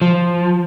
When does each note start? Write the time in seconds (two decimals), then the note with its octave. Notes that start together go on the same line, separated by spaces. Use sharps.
0.02 F3